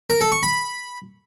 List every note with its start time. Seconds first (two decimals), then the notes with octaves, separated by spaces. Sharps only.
0.10 A#4
0.21 A4
0.32 C#6
0.43 B5